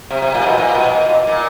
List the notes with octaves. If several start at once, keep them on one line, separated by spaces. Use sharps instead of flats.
C3
C3
A#2
B2
A#2
B2
B2
A#2
A#2